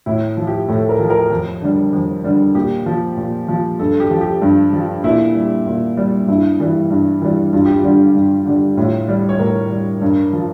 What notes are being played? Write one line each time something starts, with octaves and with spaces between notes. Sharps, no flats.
A2 E4
F3
G4
A2 A4
A#4
F3
A#4
F2
D3 G3
F2
D3 G3
A#2 G4
F3
A#2
F3
G2 A4
G4
F3
G4
G2
F3
A#2 E4
G3
A#2
G3
G2 E4
E3 G3
G2
E3 G3
G2 F4
G4
F4
D3 G3
G2
D3 G3
A2 F4
G3
C#5
A2 A#4
G3
G2
F3